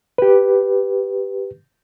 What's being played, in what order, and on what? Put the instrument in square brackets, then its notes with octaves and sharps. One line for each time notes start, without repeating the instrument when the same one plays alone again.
[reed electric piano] G4 B4